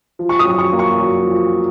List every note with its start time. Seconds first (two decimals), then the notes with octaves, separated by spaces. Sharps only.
0.19 F3
0.29 C#6
0.39 D#6
0.45 F#2
0.59 C#6
0.73 A#3
0.79 C#6
0.99 F#2
1.27 F3